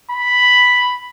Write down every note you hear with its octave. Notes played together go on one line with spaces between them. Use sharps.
B5